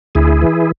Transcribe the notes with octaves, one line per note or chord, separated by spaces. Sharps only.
D2 E4 G#4
E3